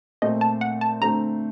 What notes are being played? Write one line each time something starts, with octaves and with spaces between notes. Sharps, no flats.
A#2 A3 C4 D#5
A5
F#5
A5
D3 A3 C4 A#5